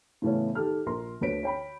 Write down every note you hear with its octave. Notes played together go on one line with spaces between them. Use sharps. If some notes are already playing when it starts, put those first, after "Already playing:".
A2 C#3 E3 A3 B3 C#4
D#3 G4 A4 F6
A#1 A#4 C6
D2 D3 B4 C#5 B6 D7
C#5 G5 B5